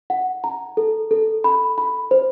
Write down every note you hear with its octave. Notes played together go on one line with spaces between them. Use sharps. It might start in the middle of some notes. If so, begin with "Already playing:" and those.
F#5
A#5
A4
A4
B5
B5
C5